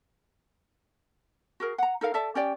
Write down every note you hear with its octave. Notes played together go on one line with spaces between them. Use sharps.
F#4 G#4 A#4
F#5 A#5
D#4 A4 A#4 F5
A4 D5 E5 A5
C#4 G4 D5 G5